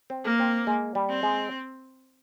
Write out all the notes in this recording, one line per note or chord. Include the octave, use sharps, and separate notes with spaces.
C4
A#3
C4
G#3
G3
C4
G#3